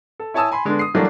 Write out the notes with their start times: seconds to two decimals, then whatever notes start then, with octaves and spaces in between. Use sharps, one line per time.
0.20 A4
0.34 E4 C#5 G#5 A5 D#6 E6
0.52 G#5 B5 C6
0.65 D3 G#3 B3 D4
0.79 D#6 C7
0.94 E3 F#3 G3 A3 A#3 D4